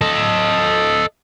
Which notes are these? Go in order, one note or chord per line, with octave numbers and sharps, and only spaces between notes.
A4 D#5